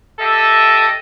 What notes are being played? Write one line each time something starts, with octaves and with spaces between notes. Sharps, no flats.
G4 A4 D#5 E5